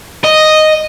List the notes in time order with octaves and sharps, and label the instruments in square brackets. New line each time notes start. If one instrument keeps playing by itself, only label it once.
[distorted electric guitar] D#5